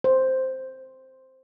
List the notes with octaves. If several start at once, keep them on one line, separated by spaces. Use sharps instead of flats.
C5